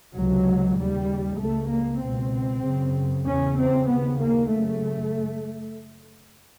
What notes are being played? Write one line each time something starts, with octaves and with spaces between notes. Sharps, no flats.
C#2 C3 F#3
D#2 C#3 G3
C#2 C#3 A3
A#3
C#2 B2 C4
F#2 C#3
E2 C#3 C#4
C4
D#2 C#3 B3
A#3
F#2 C#3 A3